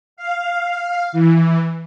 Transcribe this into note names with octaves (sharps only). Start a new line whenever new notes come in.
F5
E3